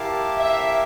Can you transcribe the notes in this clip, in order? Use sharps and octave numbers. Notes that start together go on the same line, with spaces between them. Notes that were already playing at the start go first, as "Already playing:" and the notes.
Already playing: E4 G4 A#4 F5 A5
E5